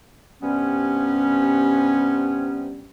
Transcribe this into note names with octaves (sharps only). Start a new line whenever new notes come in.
G2 C3 G3 B3 C#4